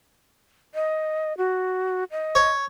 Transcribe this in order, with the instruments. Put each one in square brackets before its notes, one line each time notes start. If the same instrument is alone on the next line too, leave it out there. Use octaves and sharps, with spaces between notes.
[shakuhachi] D#5
F#4
D#5
[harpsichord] C#5